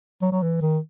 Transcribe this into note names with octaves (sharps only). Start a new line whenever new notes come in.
F#3
F#3
E3
D#3